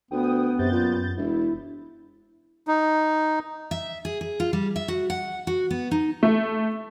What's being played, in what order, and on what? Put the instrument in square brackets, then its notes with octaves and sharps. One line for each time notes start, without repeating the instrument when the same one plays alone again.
[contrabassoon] D2 [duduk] B3 [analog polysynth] G5 D#6
[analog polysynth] F#2 G6 A6 [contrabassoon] C3
[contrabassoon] A#2
[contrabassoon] E1 [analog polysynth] E4
[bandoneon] D#4
[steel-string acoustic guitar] E5
G#4
G#4
F4
G3
E5
F#4
F#5
F#4
B3
D#4
[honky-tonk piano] A3